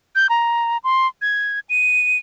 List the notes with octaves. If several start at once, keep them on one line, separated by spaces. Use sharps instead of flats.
G6
A#5
C6
G#6
D#7